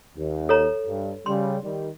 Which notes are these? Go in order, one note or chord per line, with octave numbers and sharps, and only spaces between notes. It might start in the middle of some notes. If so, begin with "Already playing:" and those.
D#2
A4 C#5 A#5
G2
C#3 G3 C6
D#3 G3